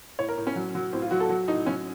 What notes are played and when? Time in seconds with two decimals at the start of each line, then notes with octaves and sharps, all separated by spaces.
0.19 A2 C#5
0.29 A#4
0.37 A2
0.47 C#4
0.56 F#3
0.75 F#3
0.93 A2 C4
1.02 F4
1.11 F#3 F#4
1.20 A4
1.29 F#3 F#4
1.48 A2 D#4
1.66 F#3 C#4